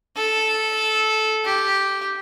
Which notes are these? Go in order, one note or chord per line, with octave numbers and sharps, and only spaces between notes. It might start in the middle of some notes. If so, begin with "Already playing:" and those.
A4
G4